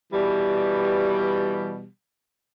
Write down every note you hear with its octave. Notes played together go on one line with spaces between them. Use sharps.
B2 E3 G3